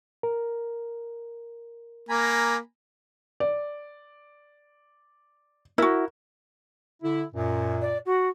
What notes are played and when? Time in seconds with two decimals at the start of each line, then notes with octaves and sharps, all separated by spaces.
0.23 A#4
2.09 A#3 G#5 A#5 B5
3.40 D5
5.78 E4 F#4 A#4
7.02 D3 E4
7.33 F#2 A#2
7.81 D5
8.05 F#4